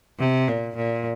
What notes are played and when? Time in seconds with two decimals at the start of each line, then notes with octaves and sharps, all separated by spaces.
0.19 C3
0.48 A#2
0.76 A#2